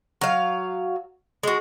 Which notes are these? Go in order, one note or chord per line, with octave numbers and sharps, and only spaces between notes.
F#3 F5
G#3 F#4